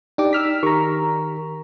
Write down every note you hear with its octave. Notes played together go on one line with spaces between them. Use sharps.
D4 D#4 G4 D6
E6 F6 B6
D#3 G4 A#4 A#5 C#6